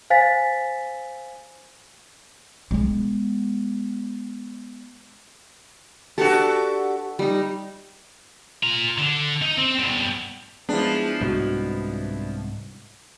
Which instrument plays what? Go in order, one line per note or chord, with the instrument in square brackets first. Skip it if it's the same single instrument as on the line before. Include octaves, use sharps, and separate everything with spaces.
[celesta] C5 F5 G#5 A6 B6
[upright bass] G#3 B3
[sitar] D4 F#4 G4 [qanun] A4 B4
[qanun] G3 D#4
[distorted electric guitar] F4 A#5
D3
D#4
C4
B2 G3
[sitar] F3 D4 [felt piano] G#3 [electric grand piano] B3 E4
[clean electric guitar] C2 G#2 [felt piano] F#4